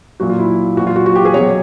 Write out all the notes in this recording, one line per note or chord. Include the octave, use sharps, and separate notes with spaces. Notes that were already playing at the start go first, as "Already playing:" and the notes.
A#2 F#3 F#4
F4
E4
A#2 F#3 F#4
F4
F#4
F#4
G4
G#4
B2 F#3 C#5